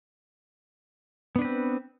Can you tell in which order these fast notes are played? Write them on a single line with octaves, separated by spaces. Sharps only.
B3 D4 B4 C4